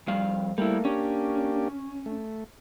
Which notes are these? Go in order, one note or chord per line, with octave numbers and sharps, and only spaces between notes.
F2 G3 F5
G3 A3 A#3 E4
A#3 C#4 D4 G4
A3